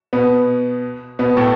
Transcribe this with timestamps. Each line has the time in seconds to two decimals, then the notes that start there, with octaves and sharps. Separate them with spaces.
0.13 B2 B3
1.19 B2 B3
1.37 A2 A3